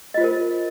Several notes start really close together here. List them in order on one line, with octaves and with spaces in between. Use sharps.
D#5 F4 C5 A#4